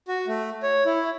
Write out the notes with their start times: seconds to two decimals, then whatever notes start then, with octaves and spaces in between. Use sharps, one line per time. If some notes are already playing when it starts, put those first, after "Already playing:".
0.08 F#4
0.27 A3
0.63 C#5
0.86 E4